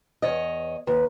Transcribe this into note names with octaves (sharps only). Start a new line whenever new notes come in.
E2 C#5 D#5
D#2 B4